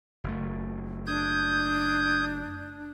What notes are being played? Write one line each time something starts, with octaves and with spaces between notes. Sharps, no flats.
F#1 A3
D4 D#6 G6 G#6